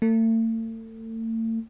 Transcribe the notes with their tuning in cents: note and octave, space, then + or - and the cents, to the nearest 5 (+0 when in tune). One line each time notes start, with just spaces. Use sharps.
A3 +40